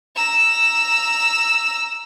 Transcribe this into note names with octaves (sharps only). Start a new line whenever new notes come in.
A#5 E6